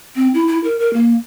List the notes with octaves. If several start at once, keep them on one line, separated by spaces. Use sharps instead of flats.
C4
E4
E4
A#4
A#4
A#3